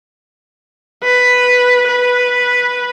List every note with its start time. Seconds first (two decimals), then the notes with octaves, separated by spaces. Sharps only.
1.04 B4
1.88 B4